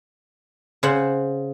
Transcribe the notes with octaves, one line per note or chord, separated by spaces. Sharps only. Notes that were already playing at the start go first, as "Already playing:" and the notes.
C#3 C5 F#5